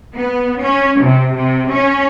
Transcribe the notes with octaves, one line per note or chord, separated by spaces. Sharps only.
B3
C#4
C3
C3
C#4